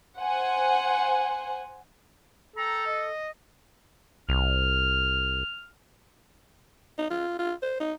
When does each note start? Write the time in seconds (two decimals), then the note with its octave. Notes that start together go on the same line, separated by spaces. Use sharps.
0.18 C5 F#5 G#5
2.56 A4 G5 A#5
2.86 D#5
4.29 C2 F6
6.98 D#4
7.11 F4
7.39 F4
7.62 C5
7.80 D#4